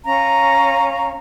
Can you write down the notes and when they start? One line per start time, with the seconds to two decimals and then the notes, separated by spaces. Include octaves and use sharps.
0.05 C#4 F5 A#5